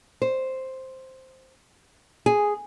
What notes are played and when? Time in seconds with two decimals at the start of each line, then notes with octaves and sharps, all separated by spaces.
0.22 C5
2.26 G#4